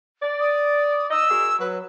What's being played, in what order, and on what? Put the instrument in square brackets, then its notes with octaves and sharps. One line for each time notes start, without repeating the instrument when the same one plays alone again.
[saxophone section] D5
[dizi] D#6
[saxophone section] D#5 [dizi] E6
[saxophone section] F#4 G#4 A#4
[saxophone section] F#3 [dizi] B4